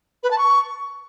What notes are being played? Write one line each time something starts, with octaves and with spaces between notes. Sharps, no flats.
B4
A5
C#6